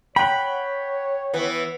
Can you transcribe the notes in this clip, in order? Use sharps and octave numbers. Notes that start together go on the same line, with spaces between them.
C#5 F#5 G5 B5
E3 B3